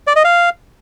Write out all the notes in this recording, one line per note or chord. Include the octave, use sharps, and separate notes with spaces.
D5
D#5
F5